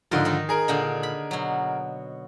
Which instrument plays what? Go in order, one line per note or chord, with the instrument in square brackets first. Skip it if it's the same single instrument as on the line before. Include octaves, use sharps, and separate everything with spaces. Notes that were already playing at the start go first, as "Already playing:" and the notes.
[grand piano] G#2 D3 F3 [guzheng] A#4 D#5 C6
[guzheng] D#3 D#4
[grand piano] G#4 A#4
[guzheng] A#2 D3 D#4
B5
B2 F#3